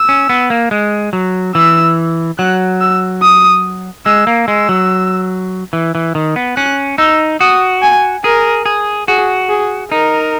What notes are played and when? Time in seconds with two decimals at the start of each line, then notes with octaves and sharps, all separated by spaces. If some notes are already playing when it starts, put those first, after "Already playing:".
Already playing: E6
0.09 C#4
0.29 B3
0.50 A#3
0.71 G#3
1.13 F#3
1.55 E3 E6
2.38 F#3 F#6
2.80 E6
3.22 D#6
4.06 G#3 E6
4.27 A#3
4.48 G#3 E6
4.69 F#3
5.73 E3
5.95 E3
6.15 D#3
6.36 B3
6.57 C#4 F#6
6.98 D#4 E6
7.40 F#4 D#6
7.82 G#5
8.24 G#4 A#4
8.66 G#4
9.08 F#4 G#4
9.49 G#4
9.92 D#4 A#4